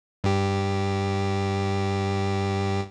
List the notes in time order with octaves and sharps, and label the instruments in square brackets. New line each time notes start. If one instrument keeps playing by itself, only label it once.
[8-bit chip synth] G2 G4